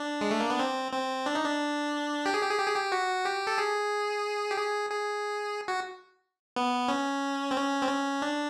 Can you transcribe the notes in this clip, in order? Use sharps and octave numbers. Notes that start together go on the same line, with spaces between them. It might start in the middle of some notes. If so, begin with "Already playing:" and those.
Already playing: D4
G#3
A3
A#3
B3
C4
C4
D4
D#4
D4
G4
G#4
G4
G#4
G4
G#4
G4
F#4
G4
A4
G#4
G4
G#4
G#4
F#4
B3
C#4
C4
C#4
C4
C#4
D4